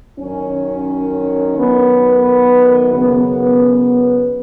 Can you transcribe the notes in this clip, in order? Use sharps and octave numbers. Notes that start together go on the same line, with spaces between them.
F#2 D#3 C#4
F#2 D#3 B3
F#2 C#3 B3